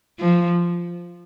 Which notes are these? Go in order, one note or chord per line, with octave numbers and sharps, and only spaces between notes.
F3